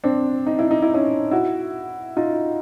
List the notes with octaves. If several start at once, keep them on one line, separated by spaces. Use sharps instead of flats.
C4 D4
D#4
E4
D#4
E4
C#4 D#4
E4 F#4
D#4 F4